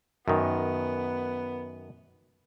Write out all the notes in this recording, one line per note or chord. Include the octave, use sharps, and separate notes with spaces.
F#2 D#3 B3